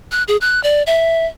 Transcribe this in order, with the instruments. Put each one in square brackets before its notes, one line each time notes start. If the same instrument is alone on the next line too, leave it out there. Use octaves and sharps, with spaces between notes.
[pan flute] F#6
G#4
F#6
D5
E5